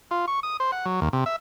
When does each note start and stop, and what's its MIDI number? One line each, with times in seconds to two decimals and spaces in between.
0.11 0.26 65
0.28 0.40 85
0.43 0.57 87
0.60 0.71 72
0.72 0.86 78
0.86 1.00 54
1.01 1.09 39
1.13 1.24 48
1.26 1.36 76